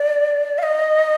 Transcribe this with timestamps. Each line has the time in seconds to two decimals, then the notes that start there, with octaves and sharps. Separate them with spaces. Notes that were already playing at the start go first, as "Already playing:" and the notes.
Already playing: D5
0.58 F5
0.63 D#5